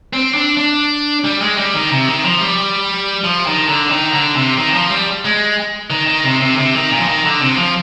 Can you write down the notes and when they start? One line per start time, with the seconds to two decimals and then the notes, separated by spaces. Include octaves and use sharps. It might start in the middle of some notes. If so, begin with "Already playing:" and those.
0.13 C4
0.34 D4
0.57 D4
1.24 G3
1.41 G#3
1.58 G3
1.74 D#3
1.91 C3
2.07 D#3
2.25 F3
2.41 G3
3.24 F3
3.46 D#3
3.69 D3
3.91 D#3
4.13 D3
4.35 C3
4.57 D#3
4.74 F3
4.91 G3
5.25 G#3
5.90 D#3
6.07 D#3
6.24 C3
6.40 C3
6.53 D3
6.58 C3
6.75 D#3
6.91 A#2
6.99 F3
7.08 D#3
7.25 D3
7.41 C3
7.57 F3